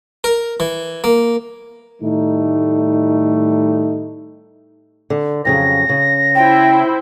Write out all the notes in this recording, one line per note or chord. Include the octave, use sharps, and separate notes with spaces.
A#4
E3
A#3
A2 D#3 G3 A3 D#4
D3
F2 C#3 F#3 A#6
C#3
E4 C5 G5